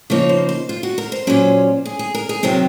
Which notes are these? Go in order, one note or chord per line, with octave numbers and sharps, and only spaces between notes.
C#3 F3 A#3 D#4 C#5
C5
C5
F4
F#4
A#4
C5
A#2 F#3 C#4
G#4
G#4
A#4
G#4
C3 D#3 F#3 C4 A#4